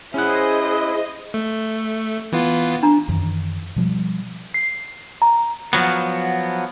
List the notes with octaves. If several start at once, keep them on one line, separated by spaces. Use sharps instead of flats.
C#4 E4 G#4 C5 D#5 F#5
A3
E3 B3 F4
D4 A#5
F#2 D#3 E3
B2 F3 G3
C7
A#5
F3 F#3 B3